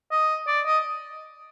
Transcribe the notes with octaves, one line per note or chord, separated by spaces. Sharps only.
D#5
D5
D#5